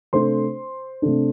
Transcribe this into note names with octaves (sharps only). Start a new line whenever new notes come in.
C3 A3 D4 C5 C6
C3 A3 D4